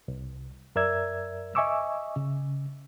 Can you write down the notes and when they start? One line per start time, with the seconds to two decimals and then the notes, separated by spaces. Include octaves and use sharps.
0.08 C2
0.75 F#2 A#4 D5 E5 E6 G#6
1.55 D#5 E5 G#5 C#6 D6 E6
2.16 C#3